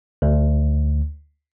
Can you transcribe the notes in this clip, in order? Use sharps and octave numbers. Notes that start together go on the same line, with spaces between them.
D2